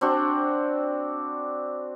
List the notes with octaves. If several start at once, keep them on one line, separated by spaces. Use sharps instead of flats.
C4 D4 F#4